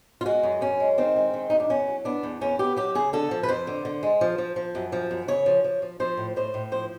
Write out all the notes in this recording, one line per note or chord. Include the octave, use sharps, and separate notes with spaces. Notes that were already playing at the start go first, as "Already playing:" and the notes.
F4
G#3 F#4
F#2
F#2 C#4
G#3
D#3 C4
G#3
D#3
F#2 D#4
D4
E2 C#4
F#3
B3 D4
E2
E2 C#4
B3 G4
F#3 G4
C#3 G#4
D3 A4
F3
B4
F2 C5
D3
D3
G#3
F3
F3
F3
F#2
F3
F#2
C#3 C#5
F3
F3
F3
F3 C5
A2
A2 C5
A2
F3 C5